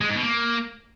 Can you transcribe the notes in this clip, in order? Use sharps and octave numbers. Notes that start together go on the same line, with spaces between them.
G#3
G#2
B2
A#3